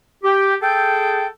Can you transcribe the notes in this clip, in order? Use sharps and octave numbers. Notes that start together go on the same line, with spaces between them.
G4
G#4 A4 G5